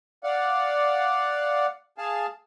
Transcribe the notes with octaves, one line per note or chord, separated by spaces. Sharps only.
D5 F5 F#5
G#4 F5 G#5 A5